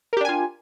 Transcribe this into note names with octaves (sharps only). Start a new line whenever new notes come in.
D4 F4 G4 A#4 G#5